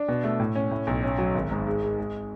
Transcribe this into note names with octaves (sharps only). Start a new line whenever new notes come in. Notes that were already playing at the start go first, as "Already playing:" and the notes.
Already playing: D4
B2
A3
A2
C#4
A2
B1
C#4
F#3
G#1
G#2
G#3
G#3
G#3